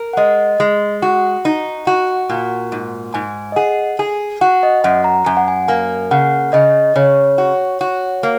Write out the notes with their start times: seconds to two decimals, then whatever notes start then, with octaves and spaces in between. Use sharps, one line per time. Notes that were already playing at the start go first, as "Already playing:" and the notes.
Already playing: A#4
0.13 F#5
0.17 G#3 D#5
0.60 G#3
1.02 F#4 F#5
1.45 D#4
1.87 F#4
2.29 A#2
2.72 G#2
3.14 G#2 G#5
3.52 D#5
3.56 G#4 F#5
3.99 G#4 G#5
4.41 F#4 F#5
4.63 D#5
4.84 F#2 F#5
5.04 A#5
5.26 F#2 G#5
5.37 F#5
5.48 G#5
5.68 A#3 G#5
6.11 C#3 F#5
6.53 C#3 D#5
6.96 C#3 C#5
7.38 F#4
7.81 F#4
8.23 A#3